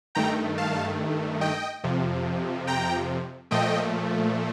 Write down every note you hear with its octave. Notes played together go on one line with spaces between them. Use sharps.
G2 D#3 A3 G5 A#5
F5 A5
D#5 G5
F2 C3 F3
G5 A#5
A#2 F3 A3 D#5 G5